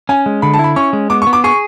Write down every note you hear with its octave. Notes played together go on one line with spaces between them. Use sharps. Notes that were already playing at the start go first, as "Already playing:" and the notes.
C#4 G#5
G#3
D3 B5
A5
E4 B5
C#4 C#6
G#3
B3 D6
C#6
B3
D6
G#4 C#6